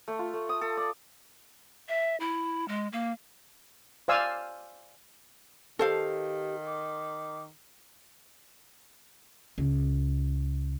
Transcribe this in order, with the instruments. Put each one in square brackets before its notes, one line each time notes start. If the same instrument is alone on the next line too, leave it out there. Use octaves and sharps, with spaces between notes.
[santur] A3
F4
A3
D#6
A4
D5
[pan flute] E5
E4
G#3
A#3
[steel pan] C5 D5 F5 G#5 E6
[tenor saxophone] D#3 [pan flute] G4 [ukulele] A4 C5 F5
[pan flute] D6
[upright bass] C#2